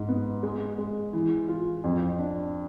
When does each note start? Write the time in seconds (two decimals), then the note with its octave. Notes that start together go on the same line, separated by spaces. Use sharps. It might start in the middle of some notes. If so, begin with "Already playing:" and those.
Already playing: G#2
0.09 B3
0.43 G#3
0.78 G#3
1.13 E3
1.48 F4
1.84 F2
2.19 D4